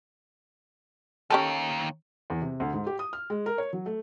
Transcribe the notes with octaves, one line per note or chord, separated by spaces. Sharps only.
D#2 D#3 C#4 G4 A4
E2
C3
D2
G#2
G4
D#6
F6
G#3
A#4
C#5
F#3
A3